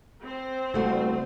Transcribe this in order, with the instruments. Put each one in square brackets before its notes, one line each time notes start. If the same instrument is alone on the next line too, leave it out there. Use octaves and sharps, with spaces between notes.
[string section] C4 C5
[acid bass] F#1 [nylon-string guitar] G3 A3 F#4